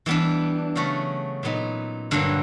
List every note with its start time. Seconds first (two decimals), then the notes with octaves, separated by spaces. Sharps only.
0.06 E3 G3 B3 D4
0.76 C#3 F#3 A3 C#4 F#4
1.43 A#2 F#3 B3 D#4
2.11 G2 D3 F#3 A#3